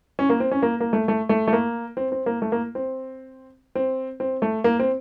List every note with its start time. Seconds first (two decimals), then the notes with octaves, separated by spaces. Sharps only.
0.19 C#4
0.30 A#3
0.40 C4
0.51 C#4
0.62 A#3
0.80 A#3
0.93 A3
1.08 A3
1.29 A3
1.48 A3
1.53 A#3
1.97 C4
2.12 C4
2.26 A#3
2.42 A3
2.52 A#3
2.75 C4
3.75 C4
4.20 C4
4.42 A3
4.64 A#3
4.79 C4